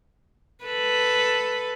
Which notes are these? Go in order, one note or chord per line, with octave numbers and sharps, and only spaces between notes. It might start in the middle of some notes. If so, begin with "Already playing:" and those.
A4 B4